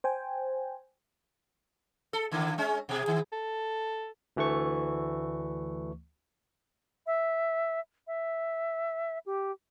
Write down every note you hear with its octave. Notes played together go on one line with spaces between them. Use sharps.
C5 G5 G#5
A4
D3 D#3 A#3
G#3 C#4
B2 G#4
D#3
A4
D2 E3 A3 C#6
E5
E5
G4